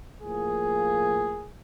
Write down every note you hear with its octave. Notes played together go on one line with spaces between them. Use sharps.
A2 F3 A#3 G#4